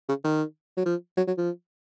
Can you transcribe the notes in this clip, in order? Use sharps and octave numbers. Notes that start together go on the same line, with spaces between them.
C#3
D#3
F#3
F3
F#3
F#3
F3